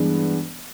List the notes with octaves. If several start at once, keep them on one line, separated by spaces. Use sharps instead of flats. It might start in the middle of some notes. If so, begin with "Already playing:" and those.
Already playing: G2 E3 G#3 B3 D4